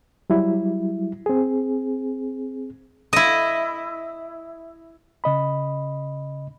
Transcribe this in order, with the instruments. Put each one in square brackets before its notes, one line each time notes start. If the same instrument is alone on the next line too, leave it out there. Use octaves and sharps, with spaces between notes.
[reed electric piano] F#3 G3 E4
C4 G#4
[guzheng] E4 D#5
[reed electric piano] C#3 D#5 B5